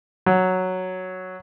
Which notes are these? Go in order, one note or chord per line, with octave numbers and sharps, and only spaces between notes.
F#3